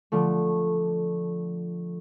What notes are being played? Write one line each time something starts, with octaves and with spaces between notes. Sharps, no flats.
D3 F3 A3